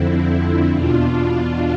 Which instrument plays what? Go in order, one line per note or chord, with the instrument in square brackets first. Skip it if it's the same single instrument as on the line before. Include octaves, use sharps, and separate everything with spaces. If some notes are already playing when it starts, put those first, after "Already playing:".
Already playing: [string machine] F2 D3 C4 E4
E2 B2 D4 F4